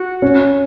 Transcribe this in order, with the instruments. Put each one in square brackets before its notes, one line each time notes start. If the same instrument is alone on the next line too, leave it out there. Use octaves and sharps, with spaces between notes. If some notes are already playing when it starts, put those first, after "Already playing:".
Already playing: [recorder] F#4
[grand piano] C#4